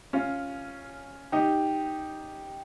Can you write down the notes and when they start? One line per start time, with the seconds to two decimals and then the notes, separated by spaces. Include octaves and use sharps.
0.13 C#4 F4
1.32 D#4 G4